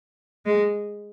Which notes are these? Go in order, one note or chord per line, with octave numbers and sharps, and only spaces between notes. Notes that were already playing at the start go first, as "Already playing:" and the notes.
G#3